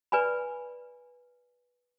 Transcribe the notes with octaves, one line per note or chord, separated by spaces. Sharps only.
B4 D5 G#5 B5